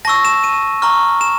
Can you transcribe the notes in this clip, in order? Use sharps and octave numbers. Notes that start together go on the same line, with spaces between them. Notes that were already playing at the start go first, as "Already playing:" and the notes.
A5 C#6 E6 A#6
E7
D#7
A#5 C#6 F6
E7